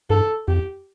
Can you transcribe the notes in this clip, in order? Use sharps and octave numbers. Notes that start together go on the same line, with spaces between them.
G2 A4
F2 G4